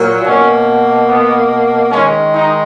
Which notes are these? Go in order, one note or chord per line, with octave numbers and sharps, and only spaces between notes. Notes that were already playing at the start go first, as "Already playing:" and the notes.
Already playing: A#2 F#3 A#3
B2 A#3 C#4
B3
D#3 G#3 C#4
D#4